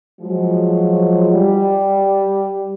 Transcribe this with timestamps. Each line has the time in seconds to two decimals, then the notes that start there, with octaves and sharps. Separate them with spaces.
0.21 F3 F#3 G#3
1.32 G3